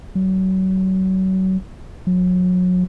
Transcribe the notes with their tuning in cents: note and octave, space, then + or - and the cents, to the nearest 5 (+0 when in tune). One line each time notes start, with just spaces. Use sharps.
F#3 +30
F#3 -30